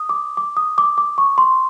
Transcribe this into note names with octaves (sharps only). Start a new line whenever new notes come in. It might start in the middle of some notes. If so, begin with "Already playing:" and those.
Already playing: D#6
D6
D6
D#6
D6
D6
C#6
C6